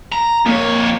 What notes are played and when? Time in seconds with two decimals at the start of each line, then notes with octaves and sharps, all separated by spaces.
0.12 A#5
0.46 F2 A#3 C#5